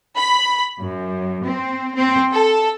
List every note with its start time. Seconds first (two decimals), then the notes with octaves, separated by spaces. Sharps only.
0.16 B5
0.82 F#2
1.46 C4
1.95 C4
2.32 A4